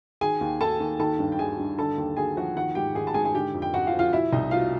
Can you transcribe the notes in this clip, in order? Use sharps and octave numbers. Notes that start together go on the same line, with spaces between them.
D#3 G#4 G#5
D#2
D#3 A4 A5
D#2
D#3 A4 A5
G2
G5
D#3 G#4 G#5
G2
D3 A4 A5
D#2
D#2 G#4 G#5
F3 F#4 F#5
D#3 F#4 F#5
G#2 G4 G5
D#3 G#4 G#5
A5
G#2 G#4 G#5
G#4 G#5
D3 G4 G5
F2
G5
F2 F#4 F#5
F4 F5
F3
F4 F5
B2 E4 E5
C2 D#4 D#5
B2 F4 F5